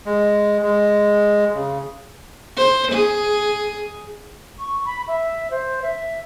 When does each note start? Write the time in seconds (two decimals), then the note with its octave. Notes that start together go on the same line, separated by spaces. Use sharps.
0.06 G#3
0.63 G#3
1.54 C#3
2.57 C5
2.92 G#4
4.59 C#6
4.86 B5
5.08 E5
5.51 C5
5.82 E5